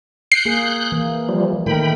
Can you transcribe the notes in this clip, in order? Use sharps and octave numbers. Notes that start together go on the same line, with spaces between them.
F#6 G6 C7
A#3 G#4
E3 A#3
F3 G3
A#2 D#3 A3 A#4 G5 B5